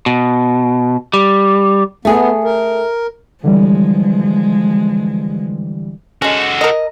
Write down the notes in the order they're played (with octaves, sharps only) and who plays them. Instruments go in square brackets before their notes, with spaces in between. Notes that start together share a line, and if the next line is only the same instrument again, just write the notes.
[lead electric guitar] B2
G3
[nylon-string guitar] A3 G#4 [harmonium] B3
[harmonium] A#4
[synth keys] D3 E3 G3 [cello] F3 G#3
[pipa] G#3 C#4 [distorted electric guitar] F#4 A4
[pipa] A#4 D#5